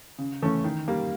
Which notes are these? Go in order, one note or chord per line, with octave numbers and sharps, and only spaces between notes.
C#3
E3 A3 C#4
D#3
G3 A#3